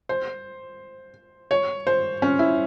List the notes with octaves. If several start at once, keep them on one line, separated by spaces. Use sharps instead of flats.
C5
C#5
C5
C#4
E4